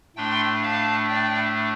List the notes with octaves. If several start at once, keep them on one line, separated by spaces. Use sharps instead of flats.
A2 A3 D4 G5 C6
F5 A5
D5 G5